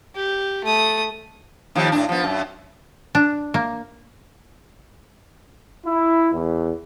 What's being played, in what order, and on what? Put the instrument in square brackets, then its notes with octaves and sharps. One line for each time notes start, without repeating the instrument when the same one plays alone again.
[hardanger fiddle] G4
A3 D#6
[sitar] D#2 D#3 F3
A2 D4
F3 B3
F#2
[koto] D4
A#3
[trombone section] E4
E2